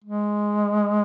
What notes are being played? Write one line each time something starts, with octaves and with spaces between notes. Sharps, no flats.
G#3